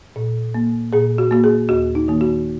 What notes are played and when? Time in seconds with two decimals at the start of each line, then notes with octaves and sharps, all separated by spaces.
0.16 A#2
0.54 A#3
0.93 A#2 G#4
1.18 F#4
1.31 A#3 F#4
1.44 G#4
1.69 D#2 F#4
1.95 D#4
2.08 D#3 A#3
2.21 F#4